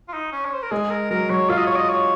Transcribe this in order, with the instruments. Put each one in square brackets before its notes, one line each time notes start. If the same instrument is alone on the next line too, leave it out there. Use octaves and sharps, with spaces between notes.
[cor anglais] F4
D#4
C#4
C#5
C5
A#4
[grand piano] G#3 [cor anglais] G#4
[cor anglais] A#4
[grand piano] F#3 [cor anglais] A#4
[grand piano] F#3 [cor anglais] C#5
[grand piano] F4 [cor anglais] F5
[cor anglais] D#5
C#5
D#5
C#5